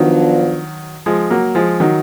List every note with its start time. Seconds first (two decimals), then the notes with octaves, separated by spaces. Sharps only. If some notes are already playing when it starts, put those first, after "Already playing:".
Already playing: D#3 F3 F#3 B3 D4 F4
1.06 F3 G#3
1.30 F#3 A#3
1.55 F3 G#3
1.80 D#3 F#3